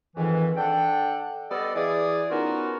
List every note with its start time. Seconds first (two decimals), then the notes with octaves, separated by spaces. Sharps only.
0.16 F2 G#2 D#3 E3
0.57 D4 A4 F#5 G5
1.51 G3 B3 G4 A4 D5 D#5
1.75 E3 G#4 D5
2.30 B3 C#4 D#4 F4 F#4 A#4